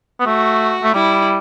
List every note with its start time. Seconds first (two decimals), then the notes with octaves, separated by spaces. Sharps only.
0.20 B3
0.26 A3 F#4
0.83 A3
0.94 G3 E4